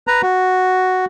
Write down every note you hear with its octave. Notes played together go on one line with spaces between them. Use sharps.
B4 A#5
F#4